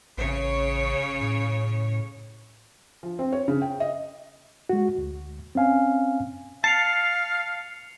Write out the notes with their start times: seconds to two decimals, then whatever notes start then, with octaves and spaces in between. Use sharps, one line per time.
0.18 A1 C#3 C#5
1.21 A2
3.03 F3
3.19 C4
3.33 C#5
3.48 C#3
3.62 G5
3.80 D#5
4.69 G#3 F#4
4.98 D2
5.55 C4 C#4 F5 G#5
6.64 F5 A5 C7 C#7 F7